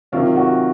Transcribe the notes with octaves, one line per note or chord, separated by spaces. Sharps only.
C3 D#3 F#3 F4
F#4